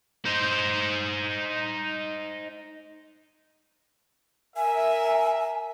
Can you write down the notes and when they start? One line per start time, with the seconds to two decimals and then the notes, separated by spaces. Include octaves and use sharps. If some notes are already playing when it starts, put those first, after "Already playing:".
0.26 D#4 C5
4.57 A#4 E5 G#5